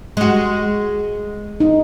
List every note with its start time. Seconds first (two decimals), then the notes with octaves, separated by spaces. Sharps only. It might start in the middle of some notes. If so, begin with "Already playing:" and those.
0.17 G#3 F#4
1.60 D#4